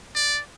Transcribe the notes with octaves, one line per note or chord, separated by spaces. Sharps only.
D5